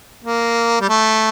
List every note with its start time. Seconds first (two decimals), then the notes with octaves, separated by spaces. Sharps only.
0.24 A#3
0.80 G3
0.89 A3